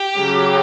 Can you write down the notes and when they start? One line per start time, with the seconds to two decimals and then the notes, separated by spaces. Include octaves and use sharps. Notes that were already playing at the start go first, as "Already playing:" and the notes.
Already playing: G4
0.20 C#3 F#3 C#4